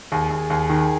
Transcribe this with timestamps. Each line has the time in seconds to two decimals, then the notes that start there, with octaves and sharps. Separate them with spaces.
0.12 D#2 G#4
0.31 D#2
0.50 D#2
0.70 D#3